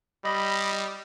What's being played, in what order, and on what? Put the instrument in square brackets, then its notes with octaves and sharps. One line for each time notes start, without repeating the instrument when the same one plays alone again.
[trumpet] G3 [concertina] D#5 B5